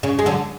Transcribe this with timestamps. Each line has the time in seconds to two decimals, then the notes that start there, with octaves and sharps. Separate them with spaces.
0.03 C#3
0.19 G#3
0.26 D3 F#3